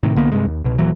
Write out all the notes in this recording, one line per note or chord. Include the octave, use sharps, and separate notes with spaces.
A2 C3 D#3
C2 D3 A#3 B3
G2 C3 G#3
D#2
C2 B2
D#1 A#2 E3 F#3